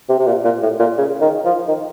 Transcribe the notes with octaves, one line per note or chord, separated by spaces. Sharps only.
C3
C3
A#2
A#2
A2
A#2
C#3
D#3
F3
D#3